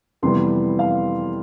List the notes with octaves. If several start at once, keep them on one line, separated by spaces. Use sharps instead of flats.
F2 C3 E3 G3 B3 C6
F5